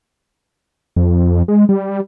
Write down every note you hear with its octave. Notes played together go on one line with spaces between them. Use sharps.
F2
G#3
G3